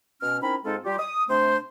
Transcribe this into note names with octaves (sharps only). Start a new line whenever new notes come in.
B2 C#4 F6
C4 C#4 D#4 E4 A#4 B5
G#2 G#3 C4 D#4 F4 A4
G3 F4 G4
D#6
C3 A3 C4 D4 C5